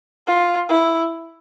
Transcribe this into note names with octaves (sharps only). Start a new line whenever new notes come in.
F4
E4